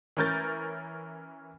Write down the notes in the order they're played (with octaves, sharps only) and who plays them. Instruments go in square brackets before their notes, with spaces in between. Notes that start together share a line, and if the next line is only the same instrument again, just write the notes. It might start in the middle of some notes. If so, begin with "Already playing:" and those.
[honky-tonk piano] E3 C#4 A#4 G6 A6